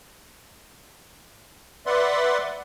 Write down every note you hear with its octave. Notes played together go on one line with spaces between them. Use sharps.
B4 D5 E5 F#5 C6